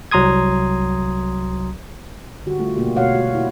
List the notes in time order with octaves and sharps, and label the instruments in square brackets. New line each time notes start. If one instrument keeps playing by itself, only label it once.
[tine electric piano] C2 F#3 A#5 C6 D#6 G#6
[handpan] D3 G3 F#4 G4
G3 A3 F4
B2 A#3 F4 G4
B2 A3 F#4 C#5 F5 F#5
F#4
E4